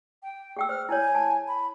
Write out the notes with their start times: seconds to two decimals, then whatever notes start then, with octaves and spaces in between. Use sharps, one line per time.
0.23 G5
0.57 G#4 G5 E6
0.69 C5 F6
0.89 E4 C#5 G#5
1.15 A5
1.48 B5